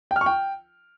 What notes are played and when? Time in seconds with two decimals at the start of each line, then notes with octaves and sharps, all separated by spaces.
0.11 G5
0.16 F6
0.21 C#6
0.26 G5